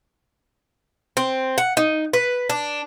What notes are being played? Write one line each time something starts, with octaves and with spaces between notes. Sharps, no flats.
C4
F#5
D#4
B4
D4